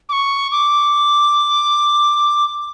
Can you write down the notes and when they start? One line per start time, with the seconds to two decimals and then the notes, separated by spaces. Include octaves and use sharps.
0.09 D6
0.13 C#6
0.52 D6